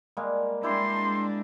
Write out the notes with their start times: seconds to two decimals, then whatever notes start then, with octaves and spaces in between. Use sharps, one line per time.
0.17 G3 G#3 A#3
0.63 G#3 D4 E4 G4 C6